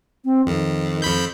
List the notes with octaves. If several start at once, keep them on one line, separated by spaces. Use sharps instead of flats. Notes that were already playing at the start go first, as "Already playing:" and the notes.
C4
F2 D#3
F2 B5 G6